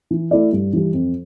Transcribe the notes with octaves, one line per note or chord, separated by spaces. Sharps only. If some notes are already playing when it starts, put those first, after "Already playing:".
E3
A3 E4 A4 D5
G2
E3 G3
F2